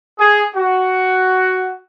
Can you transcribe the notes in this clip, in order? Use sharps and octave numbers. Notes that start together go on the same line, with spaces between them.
G#4
F#4